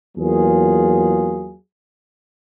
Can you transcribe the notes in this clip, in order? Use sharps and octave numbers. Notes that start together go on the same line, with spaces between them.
E2 F#3 A#3 F4 G#4